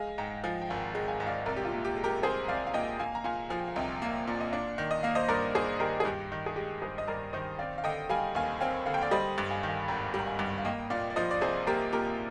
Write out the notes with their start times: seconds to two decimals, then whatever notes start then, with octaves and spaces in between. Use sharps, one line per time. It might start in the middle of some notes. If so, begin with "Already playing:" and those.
Already playing: G#3 F5 G#5
0.18 G#2 G5 A#5
0.43 F3 F5 G#5
0.62 G5
0.69 G#1 F5 G#5
0.95 G#3
1.08 F5 G#5
1.20 G#2
1.27 D5 F5
1.46 C2 A#4 D5
1.56 G4
1.65 F4
1.72 A#2
1.85 G4
1.97 G#3
2.04 G4 A#4
2.23 C2 G#4 C5
2.48 C2 D5 F5
2.67 F5
2.74 A#2 D#5 G5
2.99 A#3 F5 G#5
3.15 A#5
3.24 A#2 F5 G#5
3.50 F3 G#5
3.59 G5
3.68 F5
3.76 C2 D#5 G5
4.02 A#3
4.27 A#2 D5
4.40 D#5
4.52 D4 D5 F5
4.78 D#3
4.91 D#5
5.03 A#3 F5
5.15 C5 D#5
5.29 G2 A#4 D5
5.55 D4 G#4 C5
5.80 D#3 G4 A#4
6.00 G#4
6.05 G2 G4
6.32 D#3
6.46 G#4
6.56 G#3 G4
6.82 G2 G#4 C5
6.98 D#5
7.07 G2 A#4 D5
7.33 D#3 C5 D#5
7.59 C4 D5 F5
7.78 F5
7.84 D3 D#5 G5
8.09 G3 F5 G#5
8.35 D#2 F5 G#5
8.60 C4 F5 G#5
8.86 D3 F5
8.94 G5
9.01 D5 F5
9.11 G3 C5 D#5
9.38 G2
9.50 F5 G#5
9.63 D#3
9.69 F5 G#5
9.88 G#1 G5 A#5
10.14 G3 A#5
10.27 F5 G#5
10.39 G2
10.58 F5
10.64 A#3 D#5 G5
10.90 A#2 D5 F5
11.10 D5
11.16 F3 C5 D#5
11.31 D5
11.41 C2 G#4 C5
11.67 A#3 G4 A#4
11.93 A#2 G4 A#4